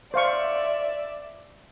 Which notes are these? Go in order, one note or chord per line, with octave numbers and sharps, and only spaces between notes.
C5 D5 E5 F5 C#6